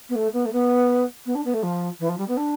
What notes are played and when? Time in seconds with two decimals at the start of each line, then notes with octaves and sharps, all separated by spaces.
0.09 B3
0.15 A3
0.33 B3
0.46 A3
0.53 B3
1.26 B3
1.35 D4
1.45 B3
1.54 A3
1.63 F3
2.00 E3
2.09 F3
2.18 G3
2.28 B3
2.37 D4